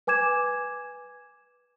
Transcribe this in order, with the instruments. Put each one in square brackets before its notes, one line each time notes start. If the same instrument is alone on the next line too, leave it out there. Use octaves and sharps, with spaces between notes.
[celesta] B4 G#5 D6 G#6 E7